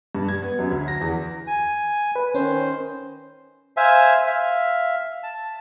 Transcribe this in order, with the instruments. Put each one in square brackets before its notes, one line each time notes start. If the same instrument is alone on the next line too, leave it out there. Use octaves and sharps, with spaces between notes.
[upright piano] G2
G#6
B3
F#2
D2
A#6
E2
[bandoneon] G#5
[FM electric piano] B4
[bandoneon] D#3 C5 [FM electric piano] C#4
[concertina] C5 E5 F5 G#5
E5 F5
A5